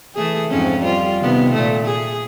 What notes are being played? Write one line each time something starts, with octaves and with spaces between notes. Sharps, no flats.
E3 A3 G#4
F2 G#2 C#4
G3 F4
C3 D#3 B3
A#2 A3
G#4